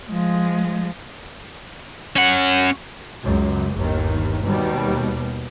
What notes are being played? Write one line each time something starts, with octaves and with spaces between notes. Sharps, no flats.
F3 G#3
C#4 F#5
C#2 F#2
G1 D#2 D#3
D#2 B2 G3